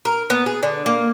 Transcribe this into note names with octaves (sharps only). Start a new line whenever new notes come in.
A#4
B3
G#4
D3
A#3